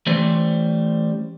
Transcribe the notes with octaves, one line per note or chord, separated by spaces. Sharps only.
E3 G3 A3 C#4 C5